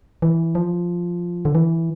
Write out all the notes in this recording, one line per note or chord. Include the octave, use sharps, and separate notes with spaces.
E3
F3
D3
E3